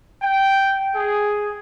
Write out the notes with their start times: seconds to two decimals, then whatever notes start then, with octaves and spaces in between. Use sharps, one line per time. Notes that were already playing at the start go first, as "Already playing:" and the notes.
0.23 G5
0.96 G#4